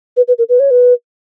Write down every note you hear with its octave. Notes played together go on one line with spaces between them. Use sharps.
B4
B4
A#4
B4
C#5
B4